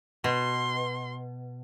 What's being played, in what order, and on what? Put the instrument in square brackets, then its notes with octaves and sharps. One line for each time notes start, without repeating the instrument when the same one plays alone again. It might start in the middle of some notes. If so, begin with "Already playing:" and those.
[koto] B2 [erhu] C6